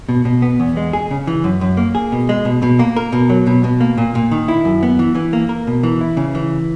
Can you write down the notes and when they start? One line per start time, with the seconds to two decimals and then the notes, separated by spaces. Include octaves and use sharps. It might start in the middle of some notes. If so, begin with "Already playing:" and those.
0.09 B2
0.25 B2
0.42 B3
0.60 E2
0.77 G#3
0.93 G#4
1.11 C#3
1.27 E3
1.44 F#2
1.61 F#2
1.77 A#3
1.95 G#4
2.12 B2
2.29 G#3
2.45 B2
2.62 B2
2.79 A#3
2.96 A#4
3.12 B2
3.29 F#3
3.47 B2
3.64 B2
3.81 A#3
3.98 A#2
4.15 A#2
4.31 D#3
4.48 E4
4.65 F#2
4.83 B3
4.99 E3
5.15 E3
5.33 A#3
5.49 A#4
5.67 B2
5.83 E3
6.01 E4
6.17 C#3
6.35 E3